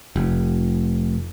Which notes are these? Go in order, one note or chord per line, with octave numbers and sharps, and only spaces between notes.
F1